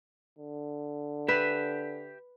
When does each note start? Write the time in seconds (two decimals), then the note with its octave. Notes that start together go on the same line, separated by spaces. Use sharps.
0.39 D3
1.28 G4 B4 E5